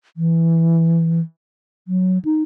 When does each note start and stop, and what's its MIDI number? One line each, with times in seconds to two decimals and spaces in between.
0.17 1.20 52
1.88 2.18 54
2.25 2.43 63